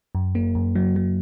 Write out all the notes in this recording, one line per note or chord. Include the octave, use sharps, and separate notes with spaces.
F#2
A#3
F#2
F#3
F#3